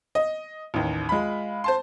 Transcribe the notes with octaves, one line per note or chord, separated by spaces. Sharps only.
D#5
A1 D#2
G#3 F4 B5
C5 A5 C6